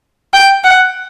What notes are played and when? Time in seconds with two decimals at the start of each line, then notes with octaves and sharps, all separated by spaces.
0.33 G5
0.64 F#5